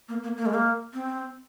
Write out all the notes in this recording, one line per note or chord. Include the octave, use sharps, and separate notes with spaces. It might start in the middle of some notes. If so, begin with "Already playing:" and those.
A#3
A#3
A#3
G#3
A#3
C4